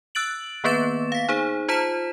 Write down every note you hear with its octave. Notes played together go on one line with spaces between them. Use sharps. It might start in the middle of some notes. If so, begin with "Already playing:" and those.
E6 F#6 A6 D7 F#7
D#3 A#3 B3 B4 A6 E7
F5 B6
D#4 G#4 C5
F4 C5 A5 B6 E7